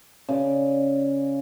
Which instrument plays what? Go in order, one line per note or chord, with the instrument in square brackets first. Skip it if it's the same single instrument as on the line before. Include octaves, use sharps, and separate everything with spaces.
[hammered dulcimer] C#3 D5